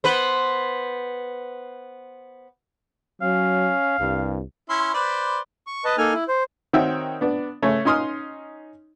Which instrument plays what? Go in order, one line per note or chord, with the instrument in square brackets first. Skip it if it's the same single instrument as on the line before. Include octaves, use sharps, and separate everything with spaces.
[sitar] B3 B4 C5
[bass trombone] F#3 [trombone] C#4 [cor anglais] F5
[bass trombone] C2 [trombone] G2
[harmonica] C#4 E4 C6
B4 C5 D5
[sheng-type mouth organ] C#6
B4 D#5 A5
A#3 D#4 A4 G#5 F6
E4
C5
[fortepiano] D#3 C4 F#4 C#5 E5 G5
B3 D4
C#3 A3 C#5
C#4 D#4 C6 D#6 F6